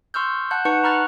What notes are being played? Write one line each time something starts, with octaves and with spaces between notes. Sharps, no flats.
C6 C#6 E6 F6 G6
F#5 A5 F#6 G6
D#4 B4 F#5 A5 C#6 C#7
A#5 B5 C#6 F6 F#6 A6